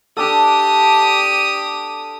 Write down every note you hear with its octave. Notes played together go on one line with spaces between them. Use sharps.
D4 G4 A4 D#6